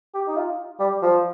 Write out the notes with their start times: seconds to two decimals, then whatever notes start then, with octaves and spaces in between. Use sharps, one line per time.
0.14 G4
0.28 D#4
0.37 F4
0.80 G3
1.03 F3